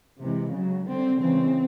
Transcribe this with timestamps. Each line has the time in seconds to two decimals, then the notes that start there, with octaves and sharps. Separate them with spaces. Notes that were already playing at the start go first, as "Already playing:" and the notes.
0.19 C3 E3 G#3
0.53 C#3 F#3
0.87 D3 G3 C4
1.19 C#3 E3 G#3 C4